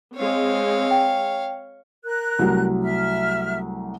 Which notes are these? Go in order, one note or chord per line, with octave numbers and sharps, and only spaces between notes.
G#3 C4 C#5 F5
G5
A#4 F#6
C2 F#3 A3
E5 F6